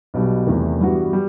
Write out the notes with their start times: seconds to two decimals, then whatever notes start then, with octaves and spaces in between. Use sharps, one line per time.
0.14 B1 B2 G3
0.47 E2 C3 D#3 A3
0.80 G2 E3 G3 B3 F#4
1.13 G3